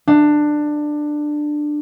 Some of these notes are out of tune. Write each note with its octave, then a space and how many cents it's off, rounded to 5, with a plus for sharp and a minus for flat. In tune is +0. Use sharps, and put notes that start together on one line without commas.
D4 +15